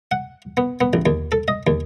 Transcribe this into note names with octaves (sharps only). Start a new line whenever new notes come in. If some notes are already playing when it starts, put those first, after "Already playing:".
F#5
B3
B3
A1
D#2
A4
D#5
D#2